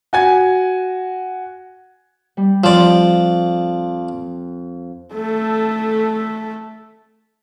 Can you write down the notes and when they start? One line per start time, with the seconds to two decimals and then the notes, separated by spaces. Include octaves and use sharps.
0.13 F#4 G#5 G#6
2.37 G3
2.64 F2 F3 D5 C6
5.14 A3 A4